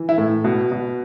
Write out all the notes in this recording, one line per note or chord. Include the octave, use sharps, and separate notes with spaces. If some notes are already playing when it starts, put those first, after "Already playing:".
Already playing: E3
E4
A2
B2
B2